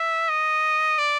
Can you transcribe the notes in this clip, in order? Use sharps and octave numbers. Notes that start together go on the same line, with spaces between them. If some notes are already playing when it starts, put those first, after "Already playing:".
Already playing: E5
D#5
D5